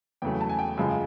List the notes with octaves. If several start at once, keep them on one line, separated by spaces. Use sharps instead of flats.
E2 C#3 F#3 A3 G5
A5
G#5
G5
F#2 C#3 F3 G#3